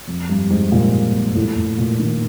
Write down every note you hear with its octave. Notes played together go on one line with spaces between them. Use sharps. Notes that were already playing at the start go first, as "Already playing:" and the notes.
F2
G2
G#2
A#2
A2
A2
A#2
D#3